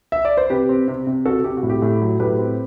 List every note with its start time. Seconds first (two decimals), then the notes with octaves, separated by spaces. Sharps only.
0.12 E5
0.25 D5
0.37 C5
0.50 C3 G4 B4
0.69 C4
0.88 C3
1.07 C3
1.26 C3 F#4 A4
1.44 C3 G4
1.57 F#4
1.63 A2
1.69 G4
1.82 A2
2.01 F#3
2.20 A2 G4 B4
2.39 C4